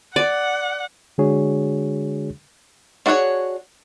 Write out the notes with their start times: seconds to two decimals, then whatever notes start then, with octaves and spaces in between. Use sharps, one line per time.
0.16 D5 F#5
1.18 D3 G#3 D4 F#4 G#4 C#5
3.06 D4 F#4 G#4 B4 C#5